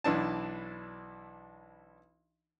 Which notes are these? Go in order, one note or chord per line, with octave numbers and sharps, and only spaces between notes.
B1 E3 D4 A5